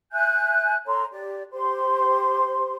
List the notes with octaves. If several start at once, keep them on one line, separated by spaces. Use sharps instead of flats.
E5 G#5 F#6 G6
A4 C#5 A#5 C6
G4 D5
G4 C5 C6